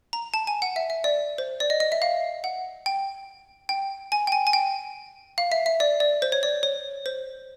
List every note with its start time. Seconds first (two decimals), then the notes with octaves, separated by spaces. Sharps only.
0.13 A#5
0.34 A5
0.47 G#5
0.62 F#5
0.76 E5
0.90 E5
1.04 D5
1.38 C5
1.60 D5
1.70 D#5
1.80 D#5
1.92 E5
2.02 F5
2.44 F#5
2.86 G5
3.69 G5
4.12 G#5
4.27 G5
4.32 G#5
4.47 G#5
4.53 G5
5.38 F5
5.52 E5
5.66 E5
5.80 D5
6.00 D5
6.22 C5
6.32 C#5
6.43 D5
6.63 C#5
7.06 C5